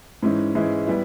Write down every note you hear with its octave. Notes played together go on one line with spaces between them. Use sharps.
G#2 E3 G#3 C#4 E4
G#2 E3 G#3 C#4 E4
G3 B3 E4